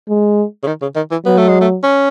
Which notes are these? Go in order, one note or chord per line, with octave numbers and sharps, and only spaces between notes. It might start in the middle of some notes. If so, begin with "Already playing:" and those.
G#3
C#3
D#3
C#3
D#3
E3
F#3 B3
A3
G#3
A3
C#4